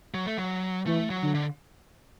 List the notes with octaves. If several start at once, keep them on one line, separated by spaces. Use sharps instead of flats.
F#3
A3
F#3
E3 A3
F#3
D3
D3